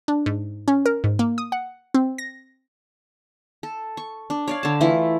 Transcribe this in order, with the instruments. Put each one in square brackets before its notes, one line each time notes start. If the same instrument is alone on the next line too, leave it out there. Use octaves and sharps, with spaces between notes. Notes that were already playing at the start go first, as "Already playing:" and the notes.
[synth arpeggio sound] D4
G#2
C#4
A#4
G#2
A#3
D#6
F#5
C4
A#6
[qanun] A4
C#6
D4
C#5 D5 F5
D3 A5
E3 A3 E4 F4